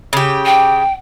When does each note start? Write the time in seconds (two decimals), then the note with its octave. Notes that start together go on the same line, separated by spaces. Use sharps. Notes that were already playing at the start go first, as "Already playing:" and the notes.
0.13 C#3 G4
0.45 G5